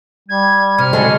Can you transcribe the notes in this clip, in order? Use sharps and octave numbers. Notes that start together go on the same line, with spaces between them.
G3 G#6
C3 F6
D3 F#3 G#3